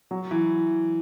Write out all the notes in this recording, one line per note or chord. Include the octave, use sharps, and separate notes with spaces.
F#3
E3